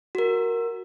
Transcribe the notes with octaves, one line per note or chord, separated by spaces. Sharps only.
F#4 A#4